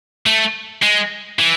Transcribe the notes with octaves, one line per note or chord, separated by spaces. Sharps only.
A3
G#3
E3